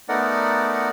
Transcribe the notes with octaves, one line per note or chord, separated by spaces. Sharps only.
A3 B3 D#4 A#4 D5 F#5